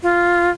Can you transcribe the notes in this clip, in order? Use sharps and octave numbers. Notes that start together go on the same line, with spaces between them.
F4